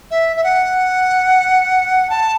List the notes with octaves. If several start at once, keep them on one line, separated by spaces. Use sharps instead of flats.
E5
E5
F#5
A5